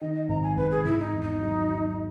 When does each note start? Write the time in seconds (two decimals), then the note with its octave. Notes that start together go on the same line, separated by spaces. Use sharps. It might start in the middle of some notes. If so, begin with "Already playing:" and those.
0.01 D#3 D#5
0.15 D#5
0.29 G#1 A#5
0.43 G#5
0.57 G#1 B4
0.71 G#4
0.85 G#1 E4
0.99 D#4
1.13 E2
1.22 D#4
1.41 F#3
1.69 F#3